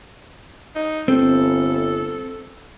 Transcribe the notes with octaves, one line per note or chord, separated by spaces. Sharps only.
D#4
G1 C4 A4